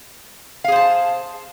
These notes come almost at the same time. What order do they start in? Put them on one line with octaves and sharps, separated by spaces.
F5 G#4 C5 A5